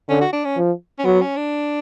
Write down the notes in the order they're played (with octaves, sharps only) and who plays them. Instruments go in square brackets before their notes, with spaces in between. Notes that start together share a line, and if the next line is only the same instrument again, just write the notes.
[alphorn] D3 [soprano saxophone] C#4
[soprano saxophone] F#4
D4
C#4
[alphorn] F3
[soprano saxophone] C#4
[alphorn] F#3 [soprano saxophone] B3
[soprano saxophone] C#4
D4